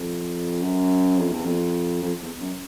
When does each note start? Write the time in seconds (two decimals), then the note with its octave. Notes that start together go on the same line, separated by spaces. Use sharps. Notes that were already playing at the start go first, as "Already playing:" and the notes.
Already playing: F2
0.61 F#2
1.18 F2
1.32 E2
1.45 F2
2.02 F2
2.22 E2
2.40 F#2